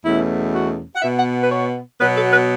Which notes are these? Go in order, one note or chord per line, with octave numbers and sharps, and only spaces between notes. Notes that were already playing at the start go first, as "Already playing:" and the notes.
E2 B2 A3 C#4 E4
F#4
F#5
B2 B3 E5
F#5
B4
C#5
B2 F#3 B3 B4
A4
B4